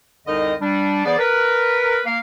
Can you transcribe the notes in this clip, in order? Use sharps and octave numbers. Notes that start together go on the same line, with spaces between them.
C2 F2 D3 D#4 A#4 D#5
G3 D4
E3 B3 G#4 C5 D5
A#4 B4
A#3 F5